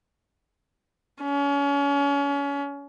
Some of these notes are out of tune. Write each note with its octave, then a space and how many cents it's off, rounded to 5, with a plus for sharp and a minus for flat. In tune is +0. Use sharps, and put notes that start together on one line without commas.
C#4 +30